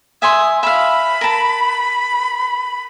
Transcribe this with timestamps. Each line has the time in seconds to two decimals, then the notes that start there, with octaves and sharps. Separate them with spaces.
0.22 E5 G#5 C6 D#6
0.63 E5 F5 B5
1.21 A#4 A5